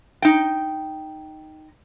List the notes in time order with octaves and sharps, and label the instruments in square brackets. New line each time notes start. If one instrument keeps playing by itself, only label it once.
[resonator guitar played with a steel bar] D#4 G5